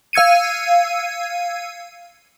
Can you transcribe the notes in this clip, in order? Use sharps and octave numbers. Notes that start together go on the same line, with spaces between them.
F5 E6 G#6 C#7 D#7